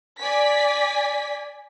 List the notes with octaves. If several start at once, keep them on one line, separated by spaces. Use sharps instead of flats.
D5 G#5 B6